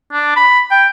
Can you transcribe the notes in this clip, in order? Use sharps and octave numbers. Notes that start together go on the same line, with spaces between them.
D4
B5
G5